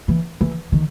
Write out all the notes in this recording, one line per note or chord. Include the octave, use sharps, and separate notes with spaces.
E3
E3
D#3